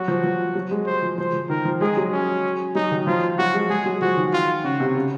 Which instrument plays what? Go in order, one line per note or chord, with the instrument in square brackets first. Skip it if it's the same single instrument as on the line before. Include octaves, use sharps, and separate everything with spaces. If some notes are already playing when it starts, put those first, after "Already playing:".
Already playing: [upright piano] F#3 [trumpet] F#4
[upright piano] F3
F3
F#3
G#3
[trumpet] C5
[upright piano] F3
[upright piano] F3 [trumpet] C5
[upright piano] F3
[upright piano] D#3 [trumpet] A#4
[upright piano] F3
[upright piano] G#3 [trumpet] G#4
[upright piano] F#3
[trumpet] C#4
[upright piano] F#3 [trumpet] D#4
[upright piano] D#3
[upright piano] F3 [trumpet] F4
[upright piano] F#3 [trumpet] F#4
[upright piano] G#3
[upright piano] G#3 [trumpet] G#4
[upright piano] F#3
[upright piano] F3 [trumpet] F#4
[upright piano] D#3
[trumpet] F4
[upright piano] C#3 [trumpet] F#4
[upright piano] C3
C#3